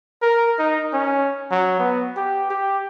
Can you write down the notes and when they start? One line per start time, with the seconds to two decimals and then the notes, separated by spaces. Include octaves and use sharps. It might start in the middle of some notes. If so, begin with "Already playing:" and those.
0.22 A#4
0.59 D#4
0.93 C#4
1.51 F#3
1.79 B3
2.17 G4
2.50 G4